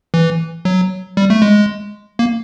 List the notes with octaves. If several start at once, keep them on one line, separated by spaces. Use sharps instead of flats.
E3
F#3
G3
A3
G#3
A#3